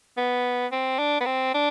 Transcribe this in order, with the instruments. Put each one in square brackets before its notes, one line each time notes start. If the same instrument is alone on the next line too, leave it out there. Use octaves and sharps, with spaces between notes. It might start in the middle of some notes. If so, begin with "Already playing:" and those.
[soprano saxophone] B3
C4
D4
B3
C4
D4